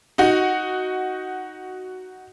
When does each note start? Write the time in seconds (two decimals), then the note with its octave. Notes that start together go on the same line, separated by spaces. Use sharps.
0.18 D#4 F#4